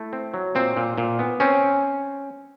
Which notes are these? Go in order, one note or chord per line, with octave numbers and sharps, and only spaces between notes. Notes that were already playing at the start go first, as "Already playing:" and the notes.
Already playing: A3 E4
C4
F#3
A#2 C4
A#2
A#2
B3
C4 C#4